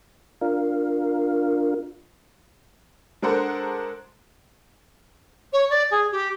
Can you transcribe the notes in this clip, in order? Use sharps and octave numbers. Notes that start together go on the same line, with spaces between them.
D4 F4 A#4 F5
G#3 D4 A4 A#4 C5 F#5
C#5
D5
G#4
G4